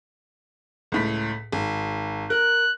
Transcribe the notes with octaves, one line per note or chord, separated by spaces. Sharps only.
C#2 A2 B6
G#1
A#4 F#6